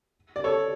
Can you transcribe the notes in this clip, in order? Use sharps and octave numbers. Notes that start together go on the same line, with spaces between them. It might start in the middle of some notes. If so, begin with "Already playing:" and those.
D5
A4 C#5